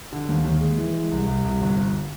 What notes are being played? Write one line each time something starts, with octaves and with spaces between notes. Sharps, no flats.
D3
D#2
D#2
G#3
E3
G#3
C2
C2
C2
G1
G1